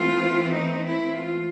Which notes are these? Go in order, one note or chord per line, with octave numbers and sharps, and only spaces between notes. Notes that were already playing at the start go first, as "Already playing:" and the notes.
Already playing: E3 A3 C4 F4
D#4
E4
F4